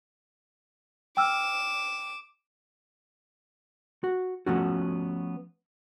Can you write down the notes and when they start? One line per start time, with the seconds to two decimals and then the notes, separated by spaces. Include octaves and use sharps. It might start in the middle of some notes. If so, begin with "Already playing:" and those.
1.17 G5 D6 E6 F6 E7
4.04 F#4
4.46 F3 A3 B3 C#4 F#4